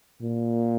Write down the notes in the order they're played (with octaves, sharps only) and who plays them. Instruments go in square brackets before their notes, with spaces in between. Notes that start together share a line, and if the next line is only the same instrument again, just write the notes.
[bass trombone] A#2